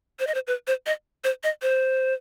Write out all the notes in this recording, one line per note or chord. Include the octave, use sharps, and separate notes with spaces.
C5
D#5
C5
B4
C5
D#5
C5
D#5
C5